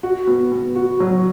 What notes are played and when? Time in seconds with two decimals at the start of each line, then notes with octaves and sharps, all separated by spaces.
0.03 F#4
0.27 B3
0.52 B3
0.76 F#4
1.00 F#3